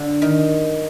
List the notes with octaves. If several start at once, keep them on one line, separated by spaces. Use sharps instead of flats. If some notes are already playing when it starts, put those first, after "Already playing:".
Already playing: D3
D#3